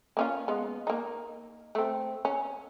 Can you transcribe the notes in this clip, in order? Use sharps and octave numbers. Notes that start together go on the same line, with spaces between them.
A#3 C#4 F4
G#3 B3
A#3 D#4
A3 C4
C#4